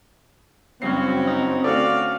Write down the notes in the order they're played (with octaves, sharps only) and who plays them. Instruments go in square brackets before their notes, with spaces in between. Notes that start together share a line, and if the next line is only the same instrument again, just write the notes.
[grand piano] F#1 G2 C7 [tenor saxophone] F#3 [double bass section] C4 [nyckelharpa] C#4 F#4
[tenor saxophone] D#4
[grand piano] D2 C#4 A4 [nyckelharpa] F#4 F5 [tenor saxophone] D5